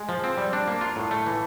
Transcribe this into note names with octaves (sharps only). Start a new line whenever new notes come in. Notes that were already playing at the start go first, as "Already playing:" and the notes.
Already playing: G#3
F3
C4
G3
D4
A#3
F4
A2
A3
E3